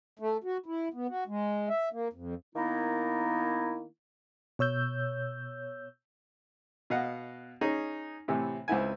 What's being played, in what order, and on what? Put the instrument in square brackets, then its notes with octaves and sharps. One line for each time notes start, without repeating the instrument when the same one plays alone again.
[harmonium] A3
F#4
E4
B3
F#4
G#3
E5
A#3
F2
[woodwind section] D#3 A#3 B3 D#4 E4
[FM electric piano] B2 C#5 E6 G6
[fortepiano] B2 D#5 F5 F#5
C#4 D#4 G#4
A2 C3 E3
C#2 C4 E4 G#5